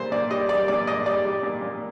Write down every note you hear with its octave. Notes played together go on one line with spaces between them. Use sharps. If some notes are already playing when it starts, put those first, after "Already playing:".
Already playing: A#2 G3 C5
A#2 D5
G3 D#5
G3 D5
A#2 D5
A#2 D#5
G3 D5
G3
A#2
A#2